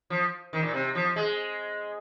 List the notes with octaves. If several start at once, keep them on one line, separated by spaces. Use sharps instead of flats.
F3
D#3
A#2
C3
F3
G#3